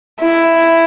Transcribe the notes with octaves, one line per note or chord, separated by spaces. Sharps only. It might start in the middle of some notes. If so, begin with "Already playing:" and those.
E4